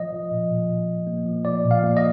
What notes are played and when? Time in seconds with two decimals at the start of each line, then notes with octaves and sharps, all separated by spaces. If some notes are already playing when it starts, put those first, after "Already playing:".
Already playing: F3 D#5
0.13 F3
0.31 A#2
0.51 A#2
0.70 A#2
0.89 A#2
1.07 A#3
1.26 F3
1.45 F3 D5
1.64 A#2
1.71 F5
1.83 A#3
1.97 D#5